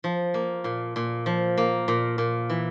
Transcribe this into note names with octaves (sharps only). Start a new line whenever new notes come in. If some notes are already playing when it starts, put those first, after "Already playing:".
F3
A#3
A#2
A#2
F3
A#3
A#2
A#2
E3